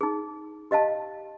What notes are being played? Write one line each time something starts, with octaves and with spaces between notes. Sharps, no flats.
D#4 G#4
G4 D#5 F5 A5